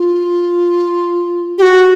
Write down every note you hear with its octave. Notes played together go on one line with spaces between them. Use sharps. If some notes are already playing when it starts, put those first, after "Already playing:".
Already playing: F4
G4
F#4